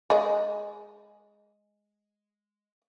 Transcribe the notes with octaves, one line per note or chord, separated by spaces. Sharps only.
G#3 D#5